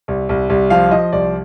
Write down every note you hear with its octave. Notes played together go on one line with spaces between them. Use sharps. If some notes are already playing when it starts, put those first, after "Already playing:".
C2
C2
C2
F3 F5
F3 D#5
C2 D5